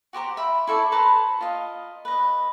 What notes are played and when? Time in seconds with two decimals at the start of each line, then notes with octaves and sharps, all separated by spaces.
0.13 F#4 G4 C5 A#5
0.37 E5 B5
0.67 E4 A4 C#5 D5
0.92 B4 C5 A5 A#5
1.41 F4 D#5
2.05 B4 D#5